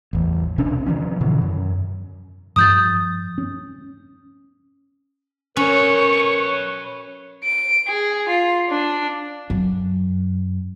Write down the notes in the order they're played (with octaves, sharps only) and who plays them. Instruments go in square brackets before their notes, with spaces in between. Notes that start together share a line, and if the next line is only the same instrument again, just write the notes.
[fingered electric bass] A1 E2
B1 C3 C#4 D4
D#3 F3 C#4
G#2 B2 D3 E3
F#2
[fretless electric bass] G2 F3 [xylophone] D#6 G6 A6
[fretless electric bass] C#4
[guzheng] C#4 [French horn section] A#4 [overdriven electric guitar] B4 C#5 [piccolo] C#6
[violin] D7
G#4
F4
D4
[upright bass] F#2